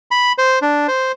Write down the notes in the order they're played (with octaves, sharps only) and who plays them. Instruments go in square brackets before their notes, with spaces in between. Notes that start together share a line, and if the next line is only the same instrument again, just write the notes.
[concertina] B5
C5
D4
C5